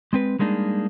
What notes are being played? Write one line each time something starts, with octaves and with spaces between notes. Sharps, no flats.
G#3 C4 B4
G3 G#3 A#3 D4 D#4 G#4